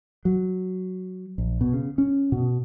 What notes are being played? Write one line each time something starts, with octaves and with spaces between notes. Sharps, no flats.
F#3
A#1
B2
C#3
C#4
B2